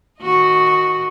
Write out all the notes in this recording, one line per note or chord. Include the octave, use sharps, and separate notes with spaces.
D#3 F#4 D#5